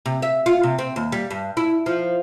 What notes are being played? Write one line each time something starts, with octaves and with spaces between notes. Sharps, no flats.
C3
E5
F4
C3
C4
D#2
G3
G2
E4
F3